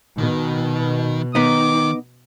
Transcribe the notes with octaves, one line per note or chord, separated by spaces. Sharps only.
B2 D#3
D#3 B3 D#4 D6